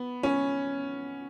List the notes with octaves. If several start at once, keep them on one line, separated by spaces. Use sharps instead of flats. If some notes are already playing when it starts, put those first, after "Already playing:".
Already playing: B3
C#4